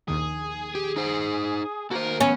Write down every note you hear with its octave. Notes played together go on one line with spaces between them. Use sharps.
A#1 D#2 D#3 G#4
G4
D#4 C5
D#3 A#3 F#4 A4 A#4 C5
F#2 B3 C#4 C#5